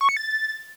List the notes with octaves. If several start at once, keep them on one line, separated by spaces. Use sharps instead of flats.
C#6
C#7
A6